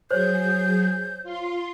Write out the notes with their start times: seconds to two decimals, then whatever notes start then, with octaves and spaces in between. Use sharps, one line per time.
0.11 F#3 G#4 C5 C#5 G6
1.23 F4 C6